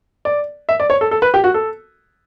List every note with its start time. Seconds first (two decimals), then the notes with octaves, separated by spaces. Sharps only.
0.25 D5
0.69 E5
0.80 D5
0.90 C#5
1.01 A4
1.11 A4
1.22 B4
1.34 G4
1.44 F#4
1.54 A4